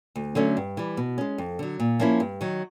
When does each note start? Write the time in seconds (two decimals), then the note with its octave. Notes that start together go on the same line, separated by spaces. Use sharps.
0.16 D2
0.35 D3 F#3 A3 C#4
0.57 G2
0.77 E3 G3
0.97 B2
1.18 G#3 C#4
1.38 F2
1.59 D3 F#3
1.80 A#2
2.00 F3 A#3 C#4 E4
2.20 G2
2.41 D#3 F#3